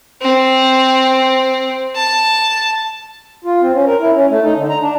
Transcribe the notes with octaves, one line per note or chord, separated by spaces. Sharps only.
C4
A5
F4
C4
C#4
A#4
E4
C#4
A3
D#4
D3
A#5
D4